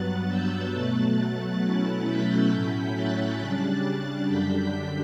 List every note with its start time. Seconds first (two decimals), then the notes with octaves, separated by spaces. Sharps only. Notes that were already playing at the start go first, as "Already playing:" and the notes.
Already playing: G2 F#3 B3 F#6 A6
0.28 E6 G6
0.73 B2 F#3 A3 F#6 A6
1.62 B2 F#3 A3 C#4 E4
2.06 G6 B6
2.51 A2 F#3 C#4 E4
2.94 F#6 A6
3.40 C#3 G3 D4
4.28 F#2 D3 G3 D4 G6 B6
4.72 G6 B6